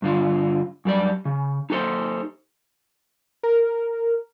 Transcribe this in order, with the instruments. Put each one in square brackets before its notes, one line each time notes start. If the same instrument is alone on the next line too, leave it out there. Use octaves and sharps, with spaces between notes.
[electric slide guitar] G2 D3 F4
F#2 G3 D5
C#3
D#4 G4 A4 C5
[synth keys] A#4